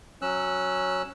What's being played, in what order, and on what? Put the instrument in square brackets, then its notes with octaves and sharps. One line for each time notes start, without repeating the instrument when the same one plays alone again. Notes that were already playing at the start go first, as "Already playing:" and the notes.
[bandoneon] F#3 C#4 E6 F#6